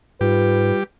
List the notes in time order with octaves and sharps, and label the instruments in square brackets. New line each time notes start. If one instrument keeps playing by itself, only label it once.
[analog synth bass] G#2 [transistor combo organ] G3 G4 [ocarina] F4 [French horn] B4